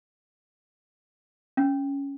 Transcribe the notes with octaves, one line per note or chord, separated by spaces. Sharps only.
C#4